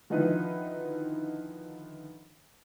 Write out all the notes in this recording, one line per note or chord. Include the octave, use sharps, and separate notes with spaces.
D3 D#3 F3 D#4 E4 B4